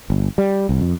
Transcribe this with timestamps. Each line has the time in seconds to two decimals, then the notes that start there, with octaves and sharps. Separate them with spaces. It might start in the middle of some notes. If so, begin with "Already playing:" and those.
0.10 G1
0.38 G3
0.69 C2
0.81 F2